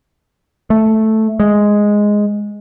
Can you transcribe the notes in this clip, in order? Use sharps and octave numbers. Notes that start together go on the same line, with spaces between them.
A3
G#3